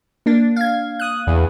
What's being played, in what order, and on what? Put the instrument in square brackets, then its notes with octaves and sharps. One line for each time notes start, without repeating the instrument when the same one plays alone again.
[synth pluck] A#3 D4
F5 G#6
D#6 F#6
[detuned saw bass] E2